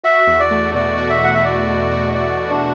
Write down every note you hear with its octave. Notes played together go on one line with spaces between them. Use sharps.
F#4 E5
E2
D5
A3
B2 D5
F#4
E5
E2 F#5
E5
A3 D5
B2
F#4
E2 D5
A3
D4